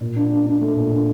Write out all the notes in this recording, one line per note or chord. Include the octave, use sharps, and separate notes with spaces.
A#2
D4
D4
D4
A3
A#2
D4